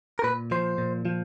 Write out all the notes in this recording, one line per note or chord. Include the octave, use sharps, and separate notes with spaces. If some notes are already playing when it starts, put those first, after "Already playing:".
A#4
A#2 B4
F3 C5
A#2
F3